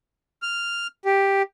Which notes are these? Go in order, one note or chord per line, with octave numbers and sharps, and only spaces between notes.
F6
G4